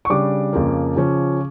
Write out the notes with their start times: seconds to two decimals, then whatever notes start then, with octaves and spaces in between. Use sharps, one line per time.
0.05 C#6
0.10 C#3 G3 D4 D6
0.53 F2 C#3 F3 A#3
0.96 C#3 F3 C#4